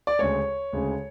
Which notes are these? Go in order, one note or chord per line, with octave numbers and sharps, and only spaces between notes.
D5
D2 C#3 G#3 C#5
D2 C#3 G#3